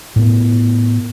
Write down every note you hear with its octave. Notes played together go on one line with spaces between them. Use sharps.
A2 B3